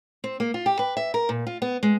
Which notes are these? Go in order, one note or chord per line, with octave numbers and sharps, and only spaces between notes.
C4
A#3
F4
G4
B4
E5
A#4
A#2
F4
B3
G#3